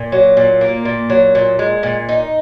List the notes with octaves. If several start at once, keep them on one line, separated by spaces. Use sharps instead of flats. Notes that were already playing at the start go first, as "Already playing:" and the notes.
Already playing: A#2
F#3
A#2
A#3
A#2
F#3
A#2
G#3
A#2
D#4